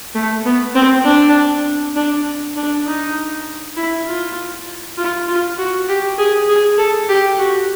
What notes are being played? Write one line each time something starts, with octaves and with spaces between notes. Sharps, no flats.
A3
B3
C4
D4
D4
D4
D#4
E4
F4
F4
F4
F#4
G4
G#4
G#4
A4
G4
F#4